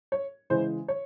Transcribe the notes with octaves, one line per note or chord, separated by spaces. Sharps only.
C#5
C#3 E3 G#3 E4 C5
C#5